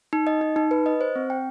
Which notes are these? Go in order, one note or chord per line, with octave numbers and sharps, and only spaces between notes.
D#4
D#5
D#4
D#4
B4
D#5
C5
C4
G5